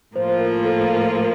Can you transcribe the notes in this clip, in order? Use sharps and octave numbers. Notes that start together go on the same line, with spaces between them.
A2 F3 A#3 F4 C5
C5
A#4
A4
A#4